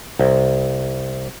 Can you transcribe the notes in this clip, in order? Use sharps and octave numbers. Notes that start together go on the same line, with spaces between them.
C2